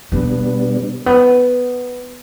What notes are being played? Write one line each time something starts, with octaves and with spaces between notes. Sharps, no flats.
B2 G3 A#3 B3 D4
B3